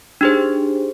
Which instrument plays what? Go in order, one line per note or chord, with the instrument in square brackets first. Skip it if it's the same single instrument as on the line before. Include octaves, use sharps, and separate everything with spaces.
[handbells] D4 D#4 G4 G#4 C5